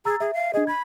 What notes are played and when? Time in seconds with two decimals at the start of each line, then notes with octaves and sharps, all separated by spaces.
0.05 G#4 A#5 E6 A6
0.20 G#4 E5
0.34 F5
0.54 D4 G#4 D#5
0.67 B5 G#6